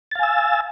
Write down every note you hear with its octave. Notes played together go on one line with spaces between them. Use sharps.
F5 G#5 E6 A6